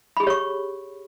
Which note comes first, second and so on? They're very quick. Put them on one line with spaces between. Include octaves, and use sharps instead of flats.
B5 G#4 G4 C#5 C#6